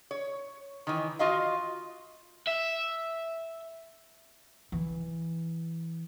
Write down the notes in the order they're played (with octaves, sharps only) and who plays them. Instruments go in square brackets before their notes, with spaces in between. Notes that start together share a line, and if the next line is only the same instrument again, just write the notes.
[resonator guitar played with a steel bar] C#5
D#3 E3
F4 F#4 D#5 F5
[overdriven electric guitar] E5
[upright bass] E3